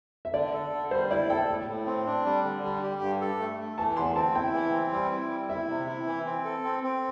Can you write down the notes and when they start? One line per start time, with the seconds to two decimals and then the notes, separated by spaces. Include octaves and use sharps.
0.25 E5
0.34 D3 D5
0.53 A4
0.72 D3
0.91 G3 C5
1.10 E4 D5
1.29 A4 G5
1.49 A2
1.68 A2
1.87 C4
2.06 D4
2.25 G3
2.44 D3
2.63 G3
2.82 G4
3.02 G2
3.21 A4
3.40 A3
3.59 A3
3.78 E3 A5
3.97 E2 C6
4.16 C4 A5
4.35 E4 G5
4.54 E3
4.73 C4
4.92 G3
5.12 E4
5.30 G3
5.49 E4 E5
5.69 C3
5.88 E4
6.07 E3
6.26 C4
6.45 A4
6.64 C4
6.83 C4